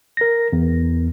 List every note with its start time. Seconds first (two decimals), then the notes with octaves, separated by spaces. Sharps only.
0.17 A#4 A#6
0.53 E2